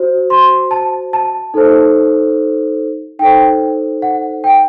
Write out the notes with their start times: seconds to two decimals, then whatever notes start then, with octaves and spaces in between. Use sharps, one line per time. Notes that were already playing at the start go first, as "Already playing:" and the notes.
Already playing: F#4 C5
0.30 C6
0.71 A5
1.13 A5
1.54 D#4 A4 C5
3.19 D#4 A4 C5 G5
4.02 F#5
4.44 G5